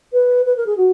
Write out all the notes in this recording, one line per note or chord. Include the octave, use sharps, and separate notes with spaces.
B4
B4
A#4
G#4
F#4